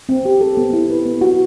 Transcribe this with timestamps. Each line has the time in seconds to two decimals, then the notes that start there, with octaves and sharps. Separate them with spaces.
0.09 C4
0.25 G4
0.41 A4
0.57 B3
0.73 E4
0.90 B4
1.05 B3
1.21 F#4